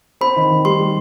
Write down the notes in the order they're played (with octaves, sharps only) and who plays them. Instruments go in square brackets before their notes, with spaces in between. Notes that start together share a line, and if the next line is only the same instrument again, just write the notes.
[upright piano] C4 [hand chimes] B5
[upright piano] D#3
D#3
[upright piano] G3 [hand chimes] C6
[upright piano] G3